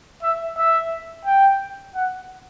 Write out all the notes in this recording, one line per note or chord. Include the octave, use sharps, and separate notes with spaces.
E5
E5
G5
F#5